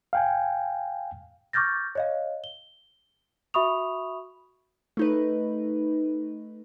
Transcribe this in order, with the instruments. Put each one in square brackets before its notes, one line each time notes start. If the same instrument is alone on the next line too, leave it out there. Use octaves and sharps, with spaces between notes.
[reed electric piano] F5 G5 G#5
[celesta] C#6 D6 F6 G6 A6 A#6
C#5 D#5 F5
G7
F#4 E5 B5 C#6 D#6 F7
[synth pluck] A3 D#4 B4